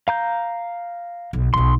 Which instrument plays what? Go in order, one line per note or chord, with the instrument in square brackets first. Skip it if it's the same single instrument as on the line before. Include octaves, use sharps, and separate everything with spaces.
[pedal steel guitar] F5 A#5 G6
[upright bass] B1
[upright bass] B1 F4 [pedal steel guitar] C6